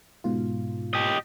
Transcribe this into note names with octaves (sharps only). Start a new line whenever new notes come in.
G#2 B2 F4
G4 D#5